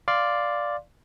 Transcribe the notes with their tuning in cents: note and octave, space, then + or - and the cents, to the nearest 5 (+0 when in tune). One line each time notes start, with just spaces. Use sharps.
D5 +0 F5 +0 C6 +0